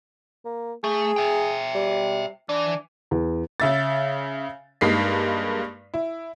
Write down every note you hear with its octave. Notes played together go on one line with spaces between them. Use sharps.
A#3
A3 G#4
E5 G5
G3
E3 D4
E2
C#3 E5 A6
G2 G#3 A#3 D#4 B6 C7
E4